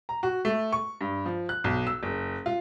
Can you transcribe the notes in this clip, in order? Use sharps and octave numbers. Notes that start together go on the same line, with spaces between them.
A#5
F#4
A3
C#6
G2
F3
F#6
B1
E6
F#1
F4